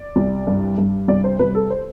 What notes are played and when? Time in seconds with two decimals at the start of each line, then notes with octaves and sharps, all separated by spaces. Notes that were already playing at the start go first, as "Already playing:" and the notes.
Already playing: D5
0.16 C2
0.47 G2
0.78 G2
1.08 C2 D5
1.24 C5
1.39 C2 B4
1.55 A4
1.70 C5